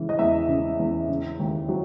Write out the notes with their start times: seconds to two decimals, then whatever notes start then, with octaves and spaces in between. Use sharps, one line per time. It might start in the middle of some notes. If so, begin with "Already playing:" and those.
Already playing: C#3 E3
0.09 D#5
0.19 E2 E5
0.49 C#3
0.79 E2
1.09 C#3
1.40 D#2
1.69 F#3